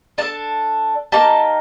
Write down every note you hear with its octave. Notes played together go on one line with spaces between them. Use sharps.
D4 A4 A5
A#3 D#4 G4 A5